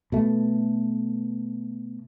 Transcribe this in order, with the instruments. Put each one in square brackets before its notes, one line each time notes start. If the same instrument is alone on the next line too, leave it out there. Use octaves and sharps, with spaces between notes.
[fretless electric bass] B2 A3